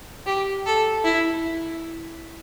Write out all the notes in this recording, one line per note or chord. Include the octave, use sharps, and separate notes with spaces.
G4
A4
E4